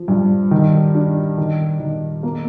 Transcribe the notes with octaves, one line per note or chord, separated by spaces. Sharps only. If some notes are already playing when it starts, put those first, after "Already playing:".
Already playing: F3
G2
D#3
D4
D#3
D#3
A#3